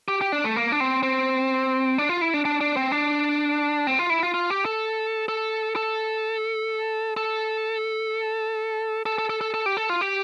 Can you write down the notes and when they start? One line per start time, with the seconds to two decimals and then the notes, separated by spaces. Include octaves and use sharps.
0.08 G4
0.21 G4
0.32 D4
0.44 A3
0.56 A#3
0.72 D4
0.80 C4
1.03 C4
1.98 D4
2.09 F4
2.21 E4
2.34 D4
2.45 D4
2.61 D4
2.77 C4
2.92 D4
3.87 C4
3.99 F4
4.10 E4
4.23 F4
4.34 F4
4.50 G4
4.65 A4
5.29 A4
5.76 A4
7.17 A4
9.06 A4
9.19 A4
9.30 A4
9.41 A4
9.54 A4
9.66 G4
9.77 A4
9.90 F4
10.01 G4